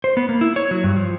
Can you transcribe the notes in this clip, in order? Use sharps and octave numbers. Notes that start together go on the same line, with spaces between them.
C5
B3
A#3
E4
C#5
F#3
G2
F3